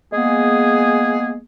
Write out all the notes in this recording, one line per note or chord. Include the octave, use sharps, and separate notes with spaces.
G#3 A#3 B3 G#4